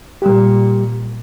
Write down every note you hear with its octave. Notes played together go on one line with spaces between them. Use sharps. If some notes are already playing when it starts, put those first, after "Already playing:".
A#2 G3 G4